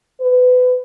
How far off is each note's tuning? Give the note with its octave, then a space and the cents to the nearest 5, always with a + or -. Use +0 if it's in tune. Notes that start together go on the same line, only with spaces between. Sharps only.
B4 +25